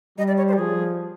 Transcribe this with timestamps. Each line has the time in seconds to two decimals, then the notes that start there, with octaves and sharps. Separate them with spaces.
0.17 G3 D#5
0.28 D5
0.38 C#5
0.48 C5
0.53 G4
0.58 F3 G#4